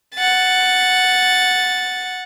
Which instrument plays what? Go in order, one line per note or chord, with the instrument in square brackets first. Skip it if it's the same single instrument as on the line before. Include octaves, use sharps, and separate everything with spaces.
[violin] F#5 A6